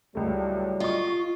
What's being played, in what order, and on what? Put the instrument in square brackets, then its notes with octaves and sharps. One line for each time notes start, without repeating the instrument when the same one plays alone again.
[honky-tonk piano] C#2 A3 [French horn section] A2 F#3 G3
[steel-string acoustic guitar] F4 [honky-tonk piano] D#5 C#6